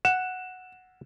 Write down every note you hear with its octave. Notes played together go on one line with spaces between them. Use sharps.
F#5 E7